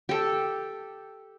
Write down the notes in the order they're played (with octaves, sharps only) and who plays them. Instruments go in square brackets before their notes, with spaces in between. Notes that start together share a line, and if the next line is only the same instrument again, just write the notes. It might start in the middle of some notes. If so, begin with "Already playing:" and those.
[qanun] G4 A4